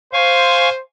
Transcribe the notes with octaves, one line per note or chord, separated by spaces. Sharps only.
C5 F5 G#5 C#6